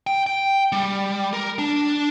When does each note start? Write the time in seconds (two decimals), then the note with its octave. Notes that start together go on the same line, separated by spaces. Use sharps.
0.07 G5
0.27 G5
0.72 G3
1.33 A#4
1.59 D4